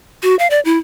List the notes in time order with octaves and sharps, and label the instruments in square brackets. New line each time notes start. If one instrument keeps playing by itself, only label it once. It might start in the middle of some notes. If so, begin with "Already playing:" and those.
[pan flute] F#4
F5
D5
E4